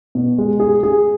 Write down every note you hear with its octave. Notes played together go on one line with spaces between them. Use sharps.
B2
G#3
G#4
G#4